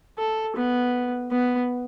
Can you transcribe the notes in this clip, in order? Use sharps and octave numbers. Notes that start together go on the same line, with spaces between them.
A4
B3
B3